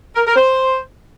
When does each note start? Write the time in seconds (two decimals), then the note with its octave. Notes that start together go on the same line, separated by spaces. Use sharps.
0.16 A#4
0.26 A#4
0.36 C5